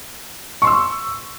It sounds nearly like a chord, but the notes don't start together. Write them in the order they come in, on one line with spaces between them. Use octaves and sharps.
C#6 C6 E6